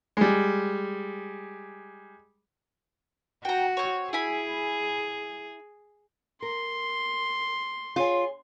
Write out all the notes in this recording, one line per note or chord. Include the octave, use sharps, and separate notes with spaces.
G3 G#3
F#4 G5 A#5
C4 C#5
E4 G#4 G#5 B5
A#4 C6
F4 G#4 C#5 G#5